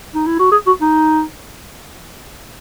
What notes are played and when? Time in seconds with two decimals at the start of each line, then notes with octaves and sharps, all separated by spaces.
0.15 D#4
0.27 E4
0.39 F#4
0.52 G#4
0.67 F#4
0.82 D#4